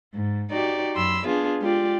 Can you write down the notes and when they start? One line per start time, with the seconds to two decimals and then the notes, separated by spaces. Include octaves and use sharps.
0.14 G#2
0.51 D#4 F#4 G4 D5
0.95 F#2 B5 C6 E6
1.27 B3 D4 F4 G#4
1.60 G#3 F4 G4 D5